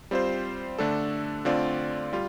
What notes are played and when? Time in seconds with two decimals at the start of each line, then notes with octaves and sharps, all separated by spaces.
0.11 G3 C4 F4 C5
0.79 D3 A3 D4 A4
1.45 D3 A3 C4 F4 D5
2.13 G3 F4